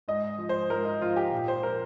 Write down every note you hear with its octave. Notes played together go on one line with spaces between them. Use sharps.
G#2 D#5
F3
C5
G#2 A#4
D#4
F3 F4
G4
A#2
C5
F3 A#4